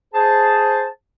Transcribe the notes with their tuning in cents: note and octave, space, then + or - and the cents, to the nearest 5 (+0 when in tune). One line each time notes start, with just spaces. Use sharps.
G#4 +0 C5 +0 A5 +0